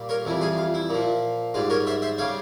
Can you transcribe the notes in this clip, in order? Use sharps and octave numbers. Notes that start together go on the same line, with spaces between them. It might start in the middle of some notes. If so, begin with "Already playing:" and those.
Already playing: A#2 G3
A#4 C#5
F2 E3 G3
F4 G#4
F4
E4
A#2 F3
G#2 G3 F4
A#4 C#5
C5 E5
C5 E5
C#3 G3 C#5 F5